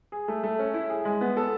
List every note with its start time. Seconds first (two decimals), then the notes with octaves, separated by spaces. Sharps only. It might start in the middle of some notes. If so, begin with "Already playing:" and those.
0.12 G#4
0.28 A3
0.43 A3
0.59 C#4
0.74 E4
0.90 G#4
1.05 G#3
1.21 B3
1.37 A4